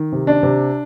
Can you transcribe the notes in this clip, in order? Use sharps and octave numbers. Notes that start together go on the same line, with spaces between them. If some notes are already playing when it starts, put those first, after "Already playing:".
Already playing: D#3
C3
D4
C3